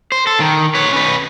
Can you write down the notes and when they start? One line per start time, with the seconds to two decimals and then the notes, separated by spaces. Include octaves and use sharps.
0.12 C5
0.27 A4
0.40 D#3
0.75 B4 C#5
0.93 C#4 B4